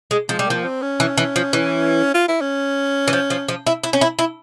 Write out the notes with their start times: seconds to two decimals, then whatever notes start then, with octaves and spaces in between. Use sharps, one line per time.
0.11 G#3
0.29 F3 G#3
0.39 G3
0.47 F3 A#3
0.64 C4
0.82 C#4
1.00 E3
1.18 E3
1.36 F3
1.53 E3
2.14 F4
2.28 E4
2.41 C#4
3.08 E3
3.13 F3
3.30 F3
3.49 F3
3.67 E4
3.84 E4
3.93 C#4
4.01 E4
4.19 E4